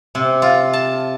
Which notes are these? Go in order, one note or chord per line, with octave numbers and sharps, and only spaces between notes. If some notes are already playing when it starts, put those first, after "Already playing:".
C3
F4
A5